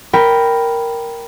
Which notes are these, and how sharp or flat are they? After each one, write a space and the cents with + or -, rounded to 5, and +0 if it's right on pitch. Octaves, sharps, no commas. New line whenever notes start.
A#4 +0 G5 +0 B5 +0